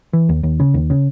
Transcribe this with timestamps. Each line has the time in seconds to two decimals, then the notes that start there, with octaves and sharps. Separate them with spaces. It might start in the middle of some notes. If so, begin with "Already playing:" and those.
0.13 E3
0.29 D#2
0.43 D#2
0.60 C#3
0.74 D#2
0.90 C#3